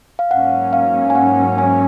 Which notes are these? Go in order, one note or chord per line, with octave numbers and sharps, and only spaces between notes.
F5
G#2 F#3 A#3 C#4 F#5
F5
G#5
F#5
G#5